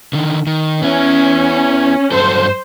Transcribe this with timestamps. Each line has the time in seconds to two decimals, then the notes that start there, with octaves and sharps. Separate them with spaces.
0.13 D3 D#3
0.47 D#3
0.82 B3 C#4 E4
2.12 G2 F#3 A4 C5